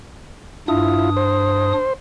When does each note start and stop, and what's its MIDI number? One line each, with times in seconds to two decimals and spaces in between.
0.68 1.73 43
0.68 1.73 62
0.68 1.10 64
0.68 1.10 65
0.68 1.73 87
1.17 1.93 72